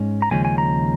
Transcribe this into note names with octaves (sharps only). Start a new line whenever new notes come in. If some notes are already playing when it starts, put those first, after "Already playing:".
Already playing: G#2 G#3 C#4
A#5
D#2 C#3 F3 G#3 C#4 G#5
G#5
A#5